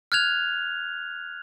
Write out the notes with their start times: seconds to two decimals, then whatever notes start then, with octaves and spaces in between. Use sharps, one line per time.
0.12 F6 F#6 G#6 F7